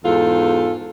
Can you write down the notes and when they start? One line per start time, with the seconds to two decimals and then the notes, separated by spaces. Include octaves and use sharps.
0.05 E2 G#2 F4 A4